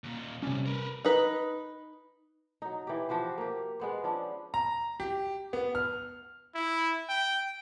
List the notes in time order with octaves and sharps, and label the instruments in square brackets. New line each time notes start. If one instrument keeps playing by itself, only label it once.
[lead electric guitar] D#2 A#2
[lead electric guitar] A2 G3 [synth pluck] C3 C#4
[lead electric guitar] A#4 B4
[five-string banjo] D#4 B4
[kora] F#3 D#4
E3 G4
F3 F#4 G4 C5
A#3 G4
G#3 B3 C5
F3 C#4 D4
[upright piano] A#5
G4
B3
F6
[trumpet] E4
G5